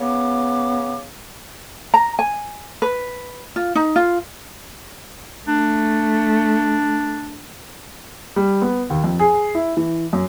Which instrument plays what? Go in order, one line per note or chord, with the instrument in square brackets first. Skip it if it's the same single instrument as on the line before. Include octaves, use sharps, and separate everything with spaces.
[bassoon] C#3 [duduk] B3 [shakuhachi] D6
[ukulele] A#5
G#5
B4
F4
D#4
F4
[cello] A3 [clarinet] D4
[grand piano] G3
B3
D#2
F2
G#4
E4
E3
F#2